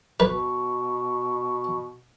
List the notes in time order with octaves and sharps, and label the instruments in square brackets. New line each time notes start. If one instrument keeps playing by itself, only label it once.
[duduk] B2 [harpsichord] B4